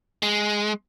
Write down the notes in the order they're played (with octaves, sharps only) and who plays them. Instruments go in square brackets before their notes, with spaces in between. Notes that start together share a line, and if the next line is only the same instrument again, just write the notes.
[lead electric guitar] G#3